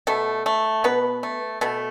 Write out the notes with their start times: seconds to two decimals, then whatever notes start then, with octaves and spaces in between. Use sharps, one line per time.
0.07 B2 A3 A4
0.46 A3
0.84 B2 B3 B4
1.23 A3
1.61 B2 A3 A4